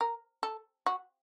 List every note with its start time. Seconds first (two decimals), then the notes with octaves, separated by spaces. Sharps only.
0.01 A#4
0.43 A4
0.86 F#4